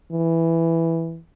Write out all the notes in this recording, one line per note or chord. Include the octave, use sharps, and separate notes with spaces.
E3